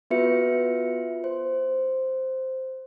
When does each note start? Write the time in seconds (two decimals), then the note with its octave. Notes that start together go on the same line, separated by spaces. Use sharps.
0.10 B3 F4 F#4 B4 E5 C#7
1.24 C5